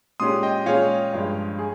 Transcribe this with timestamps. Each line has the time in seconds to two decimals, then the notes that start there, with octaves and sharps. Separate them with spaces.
0.20 A#2 G#3 C#4 G4 C6 D#6
0.43 D#5 G5
0.66 A#2 G#3 C#4 F4 G#4 C#5 F5
1.13 G2 F3 G#3
1.59 G#4